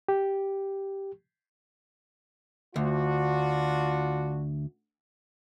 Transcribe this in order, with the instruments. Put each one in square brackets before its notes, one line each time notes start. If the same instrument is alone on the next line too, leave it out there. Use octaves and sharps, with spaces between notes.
[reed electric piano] G4
[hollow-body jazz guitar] D2 [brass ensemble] D4 F4 F#4